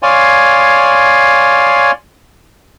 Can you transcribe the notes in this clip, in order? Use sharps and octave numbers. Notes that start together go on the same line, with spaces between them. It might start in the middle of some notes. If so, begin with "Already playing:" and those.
C#5 D5 F5 G#5 C6